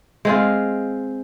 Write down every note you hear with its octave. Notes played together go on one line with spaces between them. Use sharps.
G#3 C4 F4